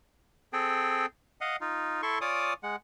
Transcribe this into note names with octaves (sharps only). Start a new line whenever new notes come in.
C4 G#4 A4 G5
D#5 F5 F#5
D#4 F4
E4 A4 C6 C#6
F4 C#5 D5 G#5 D6 D#6
G#3 F#5